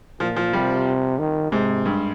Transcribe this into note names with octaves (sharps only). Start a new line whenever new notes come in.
A#2 F3
F3
C3 G3
D#3
G#2 C3
G2